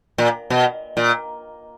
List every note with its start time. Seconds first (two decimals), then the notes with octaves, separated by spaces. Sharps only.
0.18 A#2
0.50 B2
0.97 A#2